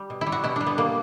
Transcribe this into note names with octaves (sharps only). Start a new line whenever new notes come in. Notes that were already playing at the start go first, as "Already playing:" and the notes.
Already playing: G3
B2
E4
G3
F#4
B2 E4
G3 D4
B3
B2 A#3